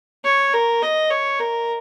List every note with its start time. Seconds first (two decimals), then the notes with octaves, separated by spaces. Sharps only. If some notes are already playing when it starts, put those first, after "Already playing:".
0.24 C#5
0.53 A#4
0.82 D#5
1.10 C#5
1.40 A#4